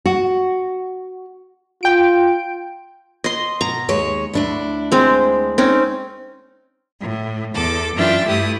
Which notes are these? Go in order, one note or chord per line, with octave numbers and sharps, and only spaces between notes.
F#4
F4 G5 D7
D#5 C6
B2 A#5
D#2 G#3 C#5
D2 D4 E4
G#3 C4
C4 C#4 D#4
A2
E2 A4 D6
F#2 E3 D4 F4 E5 G5
G2 A3 E4 G4 D#6